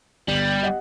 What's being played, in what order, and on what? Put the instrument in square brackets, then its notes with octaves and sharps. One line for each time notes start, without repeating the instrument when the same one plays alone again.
[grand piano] G1 [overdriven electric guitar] G3
[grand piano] G4 D#5 F#5